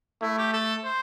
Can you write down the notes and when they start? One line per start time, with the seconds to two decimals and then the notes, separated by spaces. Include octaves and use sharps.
0.21 A3 E4
0.38 G4
0.53 A4
0.84 C5